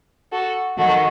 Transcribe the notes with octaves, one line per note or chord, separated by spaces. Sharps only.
F#4 A4
D#3 F#3 F#4 A4